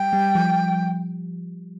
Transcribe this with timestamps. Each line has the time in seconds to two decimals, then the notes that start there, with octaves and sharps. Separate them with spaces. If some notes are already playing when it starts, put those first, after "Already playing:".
Already playing: G3 G5
0.13 G3
0.35 F3